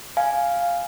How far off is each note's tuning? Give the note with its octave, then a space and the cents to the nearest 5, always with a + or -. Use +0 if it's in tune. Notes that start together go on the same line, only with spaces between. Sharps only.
F5 +0 G#5 +0